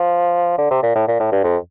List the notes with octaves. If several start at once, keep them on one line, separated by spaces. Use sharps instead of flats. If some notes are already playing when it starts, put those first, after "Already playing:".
Already playing: F3
D3
C3
A#2
A2
A#2
A2
G2
F2